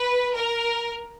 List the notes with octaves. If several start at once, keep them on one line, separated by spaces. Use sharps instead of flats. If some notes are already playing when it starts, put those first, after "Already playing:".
Already playing: B4
A#4